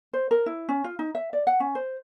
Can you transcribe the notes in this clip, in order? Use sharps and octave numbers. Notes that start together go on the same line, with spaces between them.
C5
A#4
E4
C#4
F4
D#4
E5
D5
F#5
C#4
C5